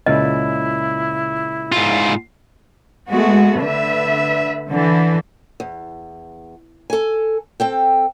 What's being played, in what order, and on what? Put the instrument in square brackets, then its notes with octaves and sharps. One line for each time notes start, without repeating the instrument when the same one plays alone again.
[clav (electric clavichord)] C#2 A#2 C#3 [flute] E4 [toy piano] D#5
[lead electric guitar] G#2 F4
[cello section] G#3 A3 B3 F#4
D3 B4 E5
D3 E3
[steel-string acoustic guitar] E2
A4 G#5
C4 A4 G5